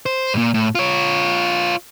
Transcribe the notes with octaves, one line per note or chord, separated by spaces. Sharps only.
C5
G2 A#2
A2
F4 C#5